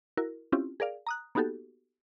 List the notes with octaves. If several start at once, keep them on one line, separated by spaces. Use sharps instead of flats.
E4 F#4 A#4
C4 C#4 E4 F4 G4
G#4 A#4 D5 F5
A#5 D#6 F#6
A#3 B3 D#4 F#4 G4 A4